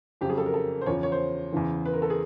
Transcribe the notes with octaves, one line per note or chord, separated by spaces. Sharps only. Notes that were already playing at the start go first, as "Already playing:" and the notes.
F2 C#3 F#3 G4
G#4
A4
A#4
A4
C5
E2 C#3 F3 C#5
C#5
C5
E2 C#3 E3
B4
A#4
A4
G#4